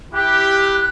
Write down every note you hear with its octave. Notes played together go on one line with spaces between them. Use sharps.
E4 G4 F#6